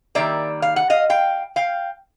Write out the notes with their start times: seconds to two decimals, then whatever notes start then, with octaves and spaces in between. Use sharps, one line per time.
0.15 D#3 G3 A#3 D5 E5
0.62 F5
0.76 F#5
0.90 D#5 F5
1.10 F5 G5
1.56 F5 G5